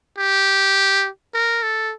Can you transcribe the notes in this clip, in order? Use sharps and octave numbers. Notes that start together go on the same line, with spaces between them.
G4
A#4
A4